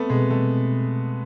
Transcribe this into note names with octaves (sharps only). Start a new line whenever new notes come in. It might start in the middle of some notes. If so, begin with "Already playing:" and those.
Already playing: A3 B3 C4
B2 G#3
G3 A3